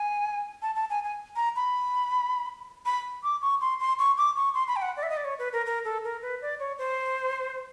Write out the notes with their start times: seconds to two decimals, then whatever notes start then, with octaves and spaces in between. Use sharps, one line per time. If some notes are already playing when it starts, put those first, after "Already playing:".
Already playing: G#5
0.62 A5
0.75 A5
0.90 G#5
1.04 G#5
1.36 A#5
1.56 B5
2.86 B5
3.23 D6
3.42 C#6
3.61 C6
3.80 C6
3.99 C#6
4.17 D6
4.36 C#6
4.54 C6
4.68 B5
4.76 G5
4.82 F#5
4.97 D5
5.03 E5
5.10 D#5
5.17 D5
5.24 C#5
5.39 B4
5.53 A#4
5.66 A#4
5.85 A4
6.04 A#4
6.22 B4
6.42 D5
6.59 C#5
6.78 C5